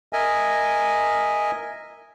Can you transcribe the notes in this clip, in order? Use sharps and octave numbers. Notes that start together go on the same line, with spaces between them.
A#4 D#5 E5 G#5